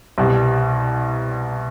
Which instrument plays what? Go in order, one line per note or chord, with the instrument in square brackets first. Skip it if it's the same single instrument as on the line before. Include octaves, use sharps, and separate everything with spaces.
[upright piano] C2 B2 G3